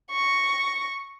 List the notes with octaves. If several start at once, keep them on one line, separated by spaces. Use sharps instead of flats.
C#6 A#6